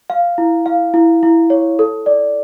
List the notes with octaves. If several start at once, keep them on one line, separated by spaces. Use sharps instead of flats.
F5
E4
F5
E4
E4
C#5
A4
D5